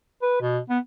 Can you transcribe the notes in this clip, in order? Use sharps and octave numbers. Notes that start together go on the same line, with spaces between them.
B4
B2
B3